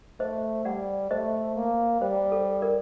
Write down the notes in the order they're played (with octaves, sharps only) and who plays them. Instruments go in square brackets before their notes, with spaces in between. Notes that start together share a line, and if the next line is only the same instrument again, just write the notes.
[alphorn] A3 [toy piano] C5 D#5
[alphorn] G3 [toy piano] D5 F#5
[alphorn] A3 [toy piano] C5 D#5
[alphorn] A#3
[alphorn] G3 [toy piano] C5
[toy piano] A4
A#4 D5